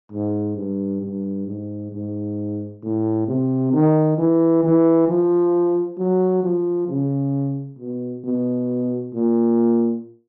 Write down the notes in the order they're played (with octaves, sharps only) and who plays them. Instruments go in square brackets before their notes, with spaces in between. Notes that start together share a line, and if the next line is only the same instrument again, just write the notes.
[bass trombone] G#2
G2
G2
G#2
G#2
A2
C3
D#3
E3
E3
F3
F#3
F3
C#3
B2
B2
A#2